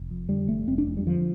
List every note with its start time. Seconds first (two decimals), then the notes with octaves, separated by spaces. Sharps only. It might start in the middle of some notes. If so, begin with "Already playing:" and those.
Already playing: F1
0.11 F2
0.29 D3 G3
0.48 F1 A3
0.68 F1 C4
0.78 D4
0.87 F2
0.97 G3
1.07 D3 F3